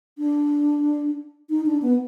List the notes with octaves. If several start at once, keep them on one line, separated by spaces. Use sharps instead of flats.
D4
D#4
D4
B3